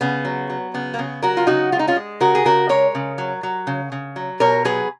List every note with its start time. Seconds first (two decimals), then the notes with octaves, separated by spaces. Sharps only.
0.01 C#3 B3
0.25 F#3
0.50 F#3
0.74 C#3 B3
0.94 A#3
0.99 C#3 B3
1.22 F#3 F#4 A#4
1.37 F4
1.47 C#3 D#4 F#4
1.72 G#3 F4
1.79 D#4
1.87 C#4 F4
1.96 G#3
2.20 C#3 F#4 A#4
2.35 G#4
2.45 C#3 F#4 A#4
2.69 G#3 A#4 C#5
2.95 C#3
3.18 F#3
3.43 F#3
3.67 C#3
3.92 C#3
4.16 F#3
4.40 B2 A#4 C#5
4.65 F#3 G#4 B4